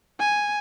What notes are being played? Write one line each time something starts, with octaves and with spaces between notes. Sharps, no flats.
G#5